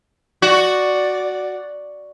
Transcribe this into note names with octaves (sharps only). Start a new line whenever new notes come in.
F#4 D5